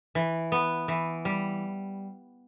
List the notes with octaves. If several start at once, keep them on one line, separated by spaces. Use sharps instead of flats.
E3
B3
E3
G3